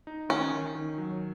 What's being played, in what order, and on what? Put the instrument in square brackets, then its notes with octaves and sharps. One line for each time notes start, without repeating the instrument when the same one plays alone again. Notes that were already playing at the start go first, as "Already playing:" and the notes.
[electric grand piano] D#4
[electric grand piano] D#3 [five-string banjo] C#4
[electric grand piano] D#3
D#3
F#3